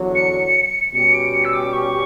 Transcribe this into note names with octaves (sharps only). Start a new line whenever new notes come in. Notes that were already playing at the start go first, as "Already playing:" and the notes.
Already playing: E2 D3 F#3
C#7
B2 G3 C#4 G4 C#7
D7
C#7
E6
D6
C#6